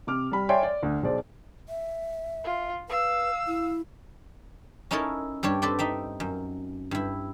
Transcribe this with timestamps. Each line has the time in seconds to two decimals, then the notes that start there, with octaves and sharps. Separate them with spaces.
0.07 C3 D6 F6
0.32 G3 B5
0.49 C#5 D5 E5 G5 G#5 C6
0.63 D5
0.83 D2
1.03 B1 G#4 C5 D5
1.69 E5
2.44 F4
2.89 B4 F5 E6
3.47 E4
4.91 C#4 D#4 E4 A4 A#4 C#5
5.43 G2 G3 D4 C#5
5.62 C4 A4 B4 D5 G5
5.79 D#4 E5 G5
6.20 F#2
6.91 G2 E4